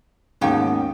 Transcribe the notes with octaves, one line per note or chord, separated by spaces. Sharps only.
D#2 G#2 B2 A#3 C#4 G5